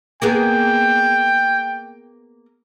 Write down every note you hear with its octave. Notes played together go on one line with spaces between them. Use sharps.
A#3 B3 G#4 G5